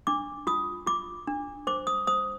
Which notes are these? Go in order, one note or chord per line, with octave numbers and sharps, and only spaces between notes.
D4 D6
F4 D#6
F4 D6
D4
C5 D6
D#6
C5 D#6